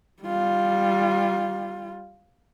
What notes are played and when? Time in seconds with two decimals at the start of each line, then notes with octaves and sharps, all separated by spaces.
0.23 G3 F4